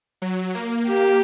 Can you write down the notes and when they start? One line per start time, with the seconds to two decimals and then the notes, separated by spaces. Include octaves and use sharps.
0.22 F#3
0.55 A#3
0.88 G4